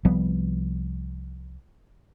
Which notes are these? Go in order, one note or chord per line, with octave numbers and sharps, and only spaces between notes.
C2 F3 G3 B3